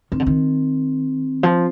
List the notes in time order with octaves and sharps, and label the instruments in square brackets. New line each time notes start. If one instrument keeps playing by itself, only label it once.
[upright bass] D#3 [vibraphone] C4
[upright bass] D3
D#3
F3